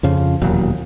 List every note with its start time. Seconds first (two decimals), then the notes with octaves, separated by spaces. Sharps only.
0.03 F2 C#3 F3
0.41 E1 D#2 A#2 F#3